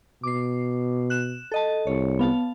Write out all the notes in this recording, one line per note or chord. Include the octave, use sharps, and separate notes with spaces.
B2 D6 C7
F#6 E7
A4 D#5 A5
C2 C#5
B3 F5 A5